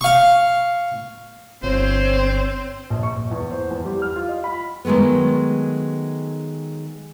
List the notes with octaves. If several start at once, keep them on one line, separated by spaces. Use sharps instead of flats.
F5 C#6
G1 C4 C5 C#5
A#1
C#6
A#1
E2
C5
E2
G3
F6
F4
D#5
B5
D#3 F#3 G#3 A3 B3